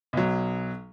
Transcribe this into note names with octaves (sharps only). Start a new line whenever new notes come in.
B1 F#3